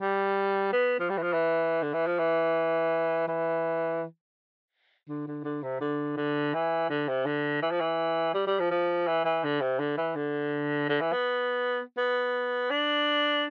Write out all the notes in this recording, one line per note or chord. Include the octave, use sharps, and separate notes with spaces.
G3
B3
F3
G3
E3
F3
E3
D3
E3
F3
E3
E3
D3
D3
D3
C3
D3
D3
E3
D3
C3
D3
E3
F3
E3
G3
G3
F3
F3
E3
E3
D3
C3
D3
E3
D3
D3
E3
B3
B3
D4